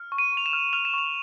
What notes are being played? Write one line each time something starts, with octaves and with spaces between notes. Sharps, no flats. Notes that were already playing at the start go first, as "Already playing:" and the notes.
Already playing: F6
C#6
D#7
C#6
F7
E7
F6
F6 F7
E7
C#6 F7